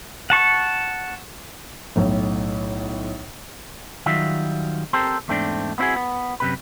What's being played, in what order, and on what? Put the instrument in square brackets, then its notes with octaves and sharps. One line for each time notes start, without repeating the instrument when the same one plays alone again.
[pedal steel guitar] F#5 A5 C#6
[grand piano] B1 A2
[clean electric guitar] D#3 F#3 G3 F4 E5
C4 G4 A4 A#4 C5
E2 G#2 A3 C4 D4
B3 C4 D#4 E4 F#4 G#4
B3
F#2 C3 B4